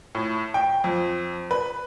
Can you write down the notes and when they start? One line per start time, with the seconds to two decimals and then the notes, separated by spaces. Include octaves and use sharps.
0.15 A2
0.54 G5
0.84 F2
1.51 B4